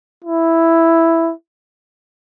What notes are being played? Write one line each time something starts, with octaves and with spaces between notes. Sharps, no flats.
E4